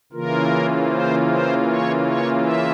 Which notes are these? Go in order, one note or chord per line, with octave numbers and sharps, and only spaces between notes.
C#3 E3 A#3 F4 A#4
C5
C5
C#5
C#5
E5